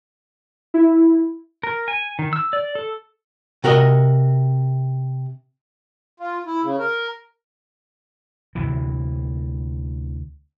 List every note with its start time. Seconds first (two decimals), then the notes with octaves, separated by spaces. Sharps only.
0.74 E4
1.63 A#4
1.88 G#5
2.19 D#3
2.33 E6
2.53 D5
2.75 A4
3.64 C3 F#4 A#4 C5 D#5
6.20 F4
6.47 E4
6.63 C#3
6.79 A#4
8.55 D2 C3 E3